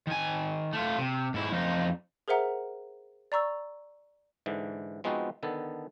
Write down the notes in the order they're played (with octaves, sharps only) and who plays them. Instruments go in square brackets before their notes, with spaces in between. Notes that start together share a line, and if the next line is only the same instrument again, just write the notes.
[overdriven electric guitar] D#3 G#5
A3 F4
C3
G#2 E4
F2 D#4
[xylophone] G#4 A#4 C5 E5 F#5 A#5
D5 A#5 C#6 E6
[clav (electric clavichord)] G#2 D3 E3
F3 G#3 B3 C4 D#4 F#4
D3 D#3 B3 A4